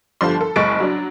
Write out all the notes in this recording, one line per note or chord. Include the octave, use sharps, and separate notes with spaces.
G1 D3 F3 G3 A5 C6
A4
F#1 G#3 C#6 A6 D7
F#3 D4